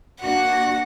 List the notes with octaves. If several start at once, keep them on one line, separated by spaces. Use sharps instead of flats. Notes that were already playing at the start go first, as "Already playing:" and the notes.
A#3 D4 F#4 F#5